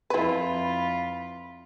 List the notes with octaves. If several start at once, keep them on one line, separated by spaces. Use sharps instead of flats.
F2 E4 F4 B4 B5